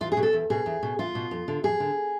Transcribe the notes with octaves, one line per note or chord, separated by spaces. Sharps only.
E2 F4
G#4
B2
A4
E2
B2 G#4
E2
B2
E2 F4
B2
F2
D3
F2 G#4
D3